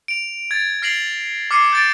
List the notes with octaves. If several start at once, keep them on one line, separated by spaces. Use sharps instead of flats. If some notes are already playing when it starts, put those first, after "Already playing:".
D7 F7
G#6 A6
F6 A#6 C7 D7 F7 F#7
D6 F6 C7 C#7 D#7
G6 A6 D7